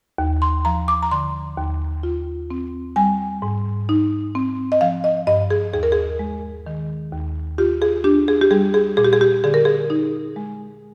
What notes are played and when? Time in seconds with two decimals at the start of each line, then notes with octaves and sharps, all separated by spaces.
0.18 D#2
0.42 C6
0.65 F3 A#5
0.88 D6
1.03 A#5
1.11 D3 C6
1.58 D#2
2.03 F4
2.50 C4
2.96 G3 G#5
3.42 G#2
3.89 D#4
4.35 C4
4.72 D#5
4.81 F3 F5
5.04 D#5
5.27 G2 D#5
5.50 G#4
5.73 D#2 G#4
5.83 A#4
5.92 G#4
6.19 G#3
6.67 D#3
7.13 D#2
7.58 F4 G4
7.82 G#4
8.04 D4 G4
8.28 G#4
8.41 G4
8.51 G3 G#4
8.74 G#4
8.97 A#2 G#4
9.05 G4
9.13 G#4
9.21 G4
9.44 D3 G#4
9.54 A#4
9.65 G#4
9.90 D#4
10.36 G#3